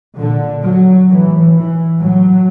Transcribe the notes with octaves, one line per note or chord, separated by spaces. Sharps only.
A#2 D3
F#3
A2 E3
E3
A2 F#3